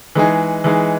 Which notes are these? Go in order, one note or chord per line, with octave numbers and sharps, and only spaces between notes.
E3 G#3 D#4 G#4
E3 G#3 D#4 G#4